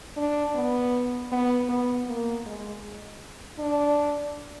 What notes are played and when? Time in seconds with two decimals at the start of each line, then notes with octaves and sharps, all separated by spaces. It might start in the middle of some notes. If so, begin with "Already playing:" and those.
0.17 D4
0.55 B3
1.32 B3
1.69 B3
2.08 A#3
2.46 G#3
3.59 D4